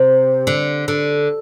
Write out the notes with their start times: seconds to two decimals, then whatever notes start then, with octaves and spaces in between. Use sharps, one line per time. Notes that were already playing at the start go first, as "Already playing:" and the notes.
Already playing: C3
0.47 D3
0.88 D3